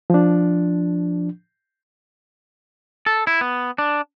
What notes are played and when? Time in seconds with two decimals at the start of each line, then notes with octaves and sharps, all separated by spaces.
0.10 F3 D4
3.06 A4
3.27 E4
3.41 B3
3.78 D4